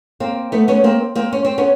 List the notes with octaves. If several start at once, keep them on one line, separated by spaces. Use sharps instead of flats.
A#3 C4
A3 B3
B3 C#4
A#3 C4
A#3 C4
C#4
C4
B3 C#4